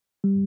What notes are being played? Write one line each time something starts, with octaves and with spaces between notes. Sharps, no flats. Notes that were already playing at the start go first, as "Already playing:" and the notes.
G3